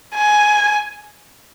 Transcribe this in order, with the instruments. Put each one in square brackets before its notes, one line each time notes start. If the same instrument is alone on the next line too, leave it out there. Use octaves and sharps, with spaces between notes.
[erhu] G#5